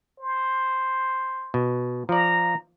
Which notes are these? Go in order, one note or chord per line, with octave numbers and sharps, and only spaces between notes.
C5
B2
F3 D5 A#5